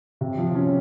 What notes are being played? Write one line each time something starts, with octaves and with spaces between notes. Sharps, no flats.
C3
F3
C#4